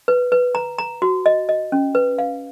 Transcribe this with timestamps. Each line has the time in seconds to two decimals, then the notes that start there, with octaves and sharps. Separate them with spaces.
0.08 B4
0.32 B4
0.55 A#5
0.79 A#5
1.02 F#4
1.26 D#5
1.49 D#5
1.72 C#4
1.95 B4
2.18 F5